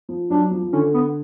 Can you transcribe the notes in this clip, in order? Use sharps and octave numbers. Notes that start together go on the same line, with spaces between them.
F3
F#3 D4
F3
F3
D3 C#4
B3